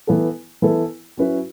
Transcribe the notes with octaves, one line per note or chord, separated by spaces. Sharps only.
E3 B3 E4 A4
E3 B3 E4 A4
F#3 C#4 E4 B4